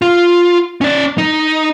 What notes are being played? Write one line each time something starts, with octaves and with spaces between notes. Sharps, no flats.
F4
C#4 D5
D#4